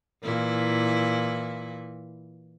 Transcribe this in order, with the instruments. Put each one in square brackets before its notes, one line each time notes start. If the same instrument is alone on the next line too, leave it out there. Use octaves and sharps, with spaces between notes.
[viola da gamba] A#2 E3 E4